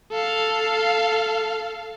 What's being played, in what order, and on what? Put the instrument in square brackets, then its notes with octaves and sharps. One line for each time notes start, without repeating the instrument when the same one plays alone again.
[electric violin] A4 F5